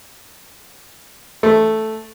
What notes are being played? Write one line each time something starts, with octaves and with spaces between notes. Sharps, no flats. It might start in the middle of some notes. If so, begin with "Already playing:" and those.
A3